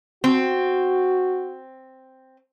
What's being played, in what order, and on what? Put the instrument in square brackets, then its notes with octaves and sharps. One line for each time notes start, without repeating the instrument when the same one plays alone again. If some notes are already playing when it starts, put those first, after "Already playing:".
[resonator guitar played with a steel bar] C4 [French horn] F#4